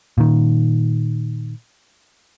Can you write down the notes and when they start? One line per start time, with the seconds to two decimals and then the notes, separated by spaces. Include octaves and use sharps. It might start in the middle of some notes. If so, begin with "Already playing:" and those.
0.18 A#2 D#3